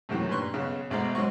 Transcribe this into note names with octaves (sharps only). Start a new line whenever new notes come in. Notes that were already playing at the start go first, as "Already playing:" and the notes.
F#2 A2 C3 D#3 E3 F#3
G2 A#2 B4 C6 C#6 F#6
B1 C#3 C#4
A1 B2 G#3 C5 F#5 A#5
G#2 F#3 C4 C5 D#5 C#6